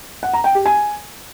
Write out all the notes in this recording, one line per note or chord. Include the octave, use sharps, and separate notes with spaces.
F#5
A#5
G5
G4
G#5